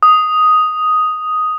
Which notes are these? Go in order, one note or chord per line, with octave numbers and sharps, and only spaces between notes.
D#6